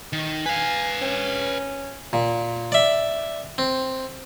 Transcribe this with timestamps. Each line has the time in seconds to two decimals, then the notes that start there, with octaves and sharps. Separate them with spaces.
0.13 D#3
0.46 B4 F5 G#5
1.02 C#4
2.13 A#2
2.72 D5 E5
3.58 C4